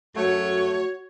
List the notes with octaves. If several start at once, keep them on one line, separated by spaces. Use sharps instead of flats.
F#2 F#3 A3 F#4 C#5